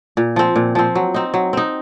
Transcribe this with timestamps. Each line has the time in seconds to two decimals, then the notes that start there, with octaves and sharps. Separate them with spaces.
0.17 A#2
0.36 F3 C4
0.56 A#2
0.75 F3 C4
0.95 F#3
1.14 C4 D#4
1.34 F#3
1.53 C4 D#4